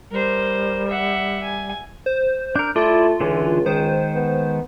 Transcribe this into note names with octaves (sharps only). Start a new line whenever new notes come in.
G3 A#4 C5
E5 F#5
G#5
C5
D4 A#4 G6
A3 E4 F4 D5
C#2 D3 E3 C#4
D#3 G#3 C5
B3